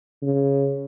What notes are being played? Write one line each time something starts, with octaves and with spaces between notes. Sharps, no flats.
C#3